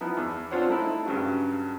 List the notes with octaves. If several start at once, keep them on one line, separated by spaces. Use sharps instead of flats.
F3 B3 D#4 E4
E2
C4 D4 F4 C5 C#5 F#5
A3 D#4 E4
G2 C#3 F#3